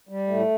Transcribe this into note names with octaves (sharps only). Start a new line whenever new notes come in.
G3
A2 A3